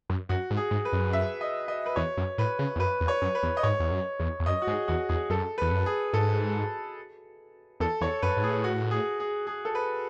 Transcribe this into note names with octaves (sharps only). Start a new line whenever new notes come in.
F#2
F#2 F#4
G#2
G#4
G#2
B4
F#2
E5
D#5
D#5
B4
E2 C#5
F#2
A2 B4
C#3
E2
F#2 B4
E2
C#5
F#2
B4
E2
D#5
G#2 C#5
E2
F#2
E2
E2
F#2 D#5
F#4
G#2 G#4
E2 F#4
E2 G#4
F#2 A4
B4
E2
F#2
G#4
G#2 A4
E2 A4
E2 C#5
F#2 B4
G#2
A2 G#4
F#4
G#4
G#4
G#4
A4
B4